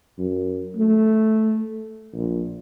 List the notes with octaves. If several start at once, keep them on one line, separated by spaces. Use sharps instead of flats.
F#2
A3
A#1